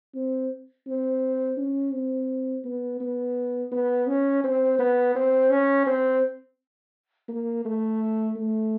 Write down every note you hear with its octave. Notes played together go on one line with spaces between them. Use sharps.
C4
C4
C#4
C4
B3
B3
B3
C#4
C4
B3
C4
C#4
C4
A#3
A3
A3